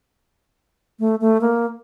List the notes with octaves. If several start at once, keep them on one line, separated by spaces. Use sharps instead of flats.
A3
A3
A#3